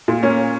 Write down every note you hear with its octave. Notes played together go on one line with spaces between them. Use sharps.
A#2
A#3 C#4